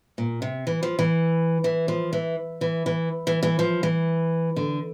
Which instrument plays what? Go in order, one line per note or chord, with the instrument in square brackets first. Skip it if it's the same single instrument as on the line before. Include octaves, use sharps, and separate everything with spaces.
[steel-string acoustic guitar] A#2
C3
E3
F3
E3
E3
F3
E3
E3
E3
E3
E3
F3
E3
D3